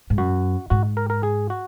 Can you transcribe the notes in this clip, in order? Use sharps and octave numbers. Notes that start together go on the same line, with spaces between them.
G#2
F#2 F#4
G#2 F#4
A#4
A#4
G#4
F#4